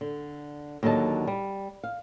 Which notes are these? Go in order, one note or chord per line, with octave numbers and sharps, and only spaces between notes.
D3
D#2 D3 F#3 D#4 A5
G3
F5